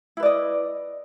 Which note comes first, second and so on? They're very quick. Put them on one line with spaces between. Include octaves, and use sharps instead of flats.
E4 B4 D5 D#5